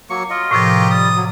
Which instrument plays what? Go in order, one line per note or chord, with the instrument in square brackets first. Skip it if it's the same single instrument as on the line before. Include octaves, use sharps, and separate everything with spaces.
[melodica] F#3 A#3 C#6
F4 D#5
[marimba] A2 C3 F3 [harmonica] G4 A#4
[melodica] G3 [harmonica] D#6
[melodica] F#3